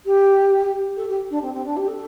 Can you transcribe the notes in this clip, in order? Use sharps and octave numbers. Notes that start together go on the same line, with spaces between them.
G4
A4
G4
D4
C4
C4
D4
G4
A4